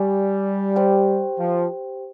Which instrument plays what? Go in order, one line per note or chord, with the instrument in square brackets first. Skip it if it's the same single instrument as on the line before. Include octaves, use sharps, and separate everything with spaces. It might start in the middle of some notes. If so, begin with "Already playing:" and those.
Already playing: [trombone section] G3 [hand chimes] G4 D5 G#5
[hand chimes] G4 C5 G5
[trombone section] F3